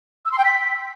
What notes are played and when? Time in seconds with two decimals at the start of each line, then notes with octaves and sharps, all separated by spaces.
0.25 E6
0.31 C6
0.38 G5
0.44 B6